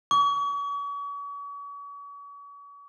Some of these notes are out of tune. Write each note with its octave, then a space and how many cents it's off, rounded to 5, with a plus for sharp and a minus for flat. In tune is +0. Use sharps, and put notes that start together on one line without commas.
C#6 +40